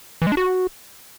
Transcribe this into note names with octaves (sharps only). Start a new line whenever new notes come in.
E3
G#3
D4
F#4